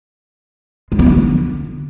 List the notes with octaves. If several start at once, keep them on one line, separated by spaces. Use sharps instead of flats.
G#3
B3
D3